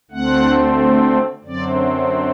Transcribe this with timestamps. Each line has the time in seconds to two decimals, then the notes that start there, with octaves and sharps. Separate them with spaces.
0.11 D2 D3 A3 C4 F#5
1.44 F#2 D3 F#3 C4 D5